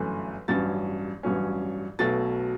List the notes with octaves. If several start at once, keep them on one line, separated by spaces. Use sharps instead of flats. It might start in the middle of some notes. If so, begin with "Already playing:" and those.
Already playing: G1 F#2 E3 A3
A1 G2 F#3 C#4 A6
A1 G2 F#3 C#4
B1 B2 F#3 A3 A6